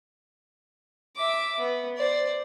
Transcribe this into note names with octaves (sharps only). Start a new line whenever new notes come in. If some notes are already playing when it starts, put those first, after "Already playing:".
E5 D6
B3
C5 D5